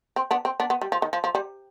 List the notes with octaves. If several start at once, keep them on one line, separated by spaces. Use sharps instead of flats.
C4
B3 D4
C4
B3 D4
B3
G3
F3
D#3
F3
F3
G3